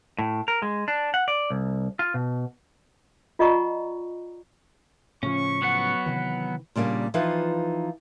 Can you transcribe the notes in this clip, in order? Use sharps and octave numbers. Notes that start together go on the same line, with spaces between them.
A2
A#4
G#3
D4
F#5
D5
C2
F4
B2
F4 D5 D#5 F#5 A#5 C#6
A2 C#3 F3 C#4 C#6
F#3 B3 F#5
C3 D#3 E3
A#2 C#3 G3 A#3 D4
E3 F3 D#4 F4 B4